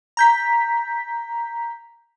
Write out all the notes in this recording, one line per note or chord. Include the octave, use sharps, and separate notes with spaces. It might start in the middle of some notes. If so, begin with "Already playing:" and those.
A#5 G6 B6